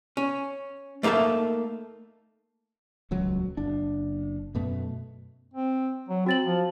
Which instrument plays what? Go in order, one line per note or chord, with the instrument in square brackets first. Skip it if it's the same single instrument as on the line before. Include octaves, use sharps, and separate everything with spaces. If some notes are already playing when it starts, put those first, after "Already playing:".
[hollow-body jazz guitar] C#4
A3 A#3 D#4 A4 E5
[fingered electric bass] D#1 C#2 F#3
F#1 D4
F#2 B2 A3
[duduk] C4
F#3
[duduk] C4 [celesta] F#4 A6 F#7
[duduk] F3